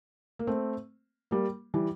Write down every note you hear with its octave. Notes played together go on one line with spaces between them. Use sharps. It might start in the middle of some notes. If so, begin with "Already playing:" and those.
A#3
A3 C4
G3 A#3
E3 G3